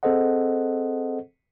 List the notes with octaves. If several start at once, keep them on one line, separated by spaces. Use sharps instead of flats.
C4 G#4 A4 C5 D#5 F#5